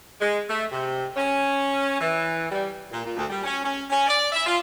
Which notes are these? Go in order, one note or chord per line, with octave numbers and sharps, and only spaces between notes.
G#3
A3
C3
C#4
E3
G3
A#2
A#2
D2
G3
C#4
C#4
C#4
D5
E5
F4